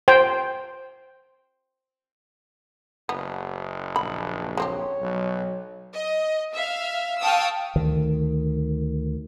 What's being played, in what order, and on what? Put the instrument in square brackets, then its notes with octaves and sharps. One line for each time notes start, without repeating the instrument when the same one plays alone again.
[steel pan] C5 G5
[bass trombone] F#1 [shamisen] B3
[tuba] A#1 [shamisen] B5
[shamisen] G#3 C4 G4 [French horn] C#5
[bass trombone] B1 [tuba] F#3
[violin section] D#5
E5 F5
F5 G5 A5 C#6 D#6 E6
[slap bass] D2 D#3